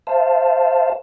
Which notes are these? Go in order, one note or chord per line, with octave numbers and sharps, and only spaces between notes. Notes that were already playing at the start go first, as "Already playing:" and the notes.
C5 E5 F5 A5